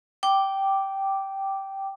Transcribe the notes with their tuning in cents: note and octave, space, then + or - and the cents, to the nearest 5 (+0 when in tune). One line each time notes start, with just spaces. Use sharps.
G5 -10 D6 +0